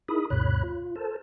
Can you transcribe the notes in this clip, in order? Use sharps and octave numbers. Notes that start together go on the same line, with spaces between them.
D#4 E4 G#4 A#4 B5 D#6
D2 G2 B2 C#5 B5 F#6
F4
A4 A#4 C5 A5